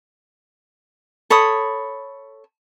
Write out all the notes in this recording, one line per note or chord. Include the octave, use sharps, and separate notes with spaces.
A4 C#5 B5 D#6